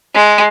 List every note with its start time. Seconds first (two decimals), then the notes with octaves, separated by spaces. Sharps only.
0.14 G#3